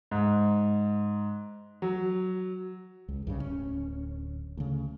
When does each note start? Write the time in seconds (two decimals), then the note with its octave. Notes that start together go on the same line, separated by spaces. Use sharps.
0.11 G#2
1.82 F#3
3.08 C#2
3.27 C2 G2 C#3
3.40 D1 C#4
4.57 D2 C#3